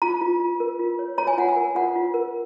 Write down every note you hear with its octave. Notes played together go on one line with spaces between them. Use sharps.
F4 A#5
F4
F4
A#4
F4
C#5
C#5 A#5
G#5
F4 F#5
G#5
A#4
F4 F#5
F4
A#4